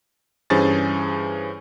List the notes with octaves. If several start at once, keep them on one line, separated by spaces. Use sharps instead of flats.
G2 E3 C#4 G#4 C5 A6